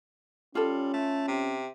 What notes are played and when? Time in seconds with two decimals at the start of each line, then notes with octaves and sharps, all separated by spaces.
0.55 G3 C#4 F4 A4
0.94 A3
1.28 C3